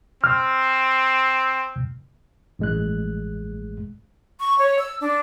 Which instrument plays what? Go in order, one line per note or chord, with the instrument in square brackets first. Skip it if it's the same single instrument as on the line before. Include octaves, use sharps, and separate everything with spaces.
[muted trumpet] C4 [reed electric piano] F6
[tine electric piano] A1 G#3 F#6
[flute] C#6
C#5
E6
D4